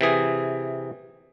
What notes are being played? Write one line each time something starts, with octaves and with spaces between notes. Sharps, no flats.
C3 E3 G#4